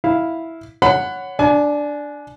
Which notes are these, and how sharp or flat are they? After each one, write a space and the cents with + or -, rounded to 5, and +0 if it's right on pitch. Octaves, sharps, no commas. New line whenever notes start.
E4 -5 F5 +0
C#5 +5 F#5 +0 B5 +30
D4 +0 G#5 +30